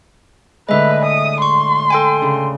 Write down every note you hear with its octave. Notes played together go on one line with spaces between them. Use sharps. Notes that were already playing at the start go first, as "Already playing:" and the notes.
A2 D3 G#3 B4 D#5 E5
D#6
C6 C#6
A4 G5 G#5
C#3 D4